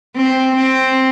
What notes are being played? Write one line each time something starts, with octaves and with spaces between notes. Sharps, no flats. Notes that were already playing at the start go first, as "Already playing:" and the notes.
C4
C4